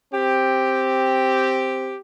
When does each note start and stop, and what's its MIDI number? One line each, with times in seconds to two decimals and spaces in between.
0.13 1.96 60
0.13 1.96 67